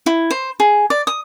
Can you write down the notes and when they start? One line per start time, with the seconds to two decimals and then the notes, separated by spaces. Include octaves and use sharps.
0.06 E4
0.31 C5
0.60 G#4
0.90 D5
1.07 D#6